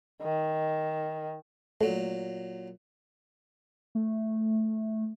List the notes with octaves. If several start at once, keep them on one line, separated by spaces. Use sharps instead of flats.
D#3
A#2 F#3 A3
A3